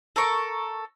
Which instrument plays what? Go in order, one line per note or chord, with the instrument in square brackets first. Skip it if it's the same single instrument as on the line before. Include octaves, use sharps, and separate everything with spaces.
[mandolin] A4 A#4 C#6